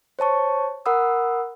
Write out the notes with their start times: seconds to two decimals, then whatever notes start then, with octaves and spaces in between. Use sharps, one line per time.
0.19 C5 C#5 A5 C#6
0.86 A#4 F#5 B5 D#6 E6